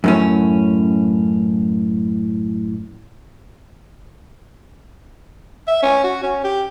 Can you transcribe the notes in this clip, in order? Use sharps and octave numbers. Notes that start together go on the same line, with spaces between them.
F#2 A2 C#4
E5
C#4
F#4
C#4
G4